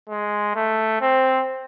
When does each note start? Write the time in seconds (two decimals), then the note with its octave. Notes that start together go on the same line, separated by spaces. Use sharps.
0.09 G#3
0.55 A3
1.01 C4